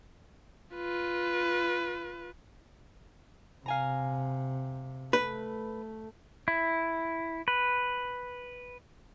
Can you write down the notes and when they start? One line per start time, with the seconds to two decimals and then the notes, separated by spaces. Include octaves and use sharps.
0.75 F4 B4
3.66 C3 F5 G#5 A#5
5.13 A3 B4
6.48 E4
7.48 B4